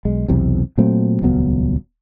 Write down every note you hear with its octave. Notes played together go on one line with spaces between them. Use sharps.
B1 G#3
B1 E2 C3
A#2 F#3 A3 C4
D#1 C#2 F#3 B3